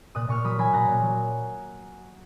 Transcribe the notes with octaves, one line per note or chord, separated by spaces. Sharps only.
A#2 D#6 F#6
A#2 C#6 F6
F#3 B5 D#6
F#3 G#5 B5
A#2 F#5 A#5
A#2
F#3